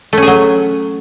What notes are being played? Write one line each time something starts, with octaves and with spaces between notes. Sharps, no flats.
F#3 A3 C#4 G#4